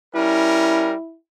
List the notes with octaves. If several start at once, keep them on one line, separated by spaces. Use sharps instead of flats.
G3 C#4 E4 A#4